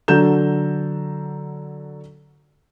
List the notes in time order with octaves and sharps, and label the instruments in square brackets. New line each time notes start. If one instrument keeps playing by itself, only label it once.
[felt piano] D3 F#3 A4 A#5 G6 E7